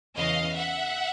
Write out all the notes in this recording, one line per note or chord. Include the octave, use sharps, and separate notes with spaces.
E2 C#3 E3 D#5 F5
E5 F#5